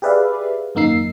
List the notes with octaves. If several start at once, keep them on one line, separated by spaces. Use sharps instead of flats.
G4 G#4 B4 D5 E5 F5
G#1 F#2 A#3 D#4 E6 C7